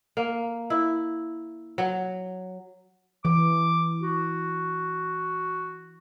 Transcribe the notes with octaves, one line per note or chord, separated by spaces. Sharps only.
A#3
E4
F#3
E3 D6
F#4